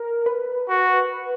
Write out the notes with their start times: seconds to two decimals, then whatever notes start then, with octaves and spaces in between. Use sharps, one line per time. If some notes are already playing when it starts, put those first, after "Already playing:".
Already playing: A#4
0.26 B4
0.69 F#4